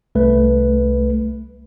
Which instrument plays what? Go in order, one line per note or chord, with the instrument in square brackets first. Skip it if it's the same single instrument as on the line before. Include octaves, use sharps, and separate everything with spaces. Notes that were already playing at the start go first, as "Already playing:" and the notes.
[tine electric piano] C2 A3 B4